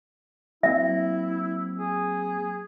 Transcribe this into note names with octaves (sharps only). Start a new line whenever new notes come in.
F#3 A#3 C4 E4 E5
G#4